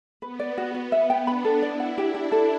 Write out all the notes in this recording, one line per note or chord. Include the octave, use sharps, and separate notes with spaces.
B3 B4
D5
B3 F#4
F#4
E5
G5
D4 B5
A4
E4 D5
F#5
D4 G4
G4
A4